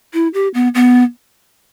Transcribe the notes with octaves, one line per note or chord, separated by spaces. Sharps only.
E4
G4
B3
B3